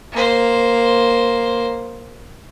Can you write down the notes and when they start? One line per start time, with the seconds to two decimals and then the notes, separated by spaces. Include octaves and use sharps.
0.12 A#3 C5